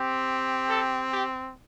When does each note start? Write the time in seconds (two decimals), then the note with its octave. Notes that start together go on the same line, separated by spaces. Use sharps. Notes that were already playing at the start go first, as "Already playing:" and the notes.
Already playing: C4 G4
0.69 A4
1.11 G4